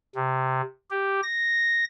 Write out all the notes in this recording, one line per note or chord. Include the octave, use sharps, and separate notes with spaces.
C3
G4
A#6